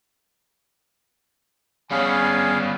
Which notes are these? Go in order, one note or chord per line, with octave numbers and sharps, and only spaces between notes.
G3 B3 C#4 G#4 F5 G#5